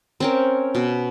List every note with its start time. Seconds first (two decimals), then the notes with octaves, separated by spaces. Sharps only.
0.20 C4 C#4 A#4
0.75 B2